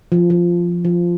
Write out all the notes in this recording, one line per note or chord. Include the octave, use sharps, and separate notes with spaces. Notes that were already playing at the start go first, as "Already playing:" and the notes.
F3
F3
F3